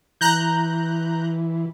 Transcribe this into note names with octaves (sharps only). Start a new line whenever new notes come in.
E3 A#5 F#6 G6